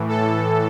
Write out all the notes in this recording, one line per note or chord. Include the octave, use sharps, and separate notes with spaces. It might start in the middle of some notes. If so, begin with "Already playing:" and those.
Already playing: A2 E3
A4